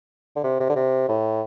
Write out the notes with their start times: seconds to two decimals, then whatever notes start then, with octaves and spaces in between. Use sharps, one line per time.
0.36 D3
0.44 C3
0.60 C3
0.69 D3
0.76 C3
1.08 A2